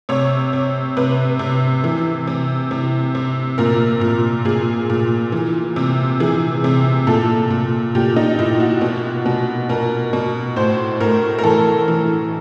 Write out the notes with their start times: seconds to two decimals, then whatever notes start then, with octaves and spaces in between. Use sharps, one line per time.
0.09 C3 C#5
0.53 C3
0.97 C3 B4
1.39 C3
1.84 E3
2.27 C3
2.71 C3
3.15 C3
3.58 A#2 A#4
4.01 A#2
4.45 A#2 G#4
4.90 A#2
5.32 E3
5.76 C3
6.20 E3 G#4
6.64 C3
7.07 A#2 A4
7.50 A#2
7.95 A#2 G4
8.16 D#4
8.39 A#2 E4
8.60 F#4
8.81 B2
9.26 B2
9.69 B2 A#4
10.13 B2
10.56 A2 C5
11.00 A2 A#4
11.39 A#4
11.44 E3 A4
11.88 E3